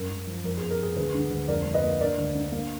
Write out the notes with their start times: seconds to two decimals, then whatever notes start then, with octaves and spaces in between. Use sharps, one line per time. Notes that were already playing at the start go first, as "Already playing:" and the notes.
Already playing: F#2 A#4
0.10 F#2
0.27 F3
0.44 F2 A#4
0.57 G#4
0.62 B3
0.70 A#4
0.79 B3 G#4
0.96 D2 G#4 B4
1.14 D3
1.31 D2
1.48 F2 A#4 D5
1.66 F2
1.74 B4 D#5
1.84 A#3
2.01 D3 A#4 D5
2.18 D2
2.35 D3
2.52 A#3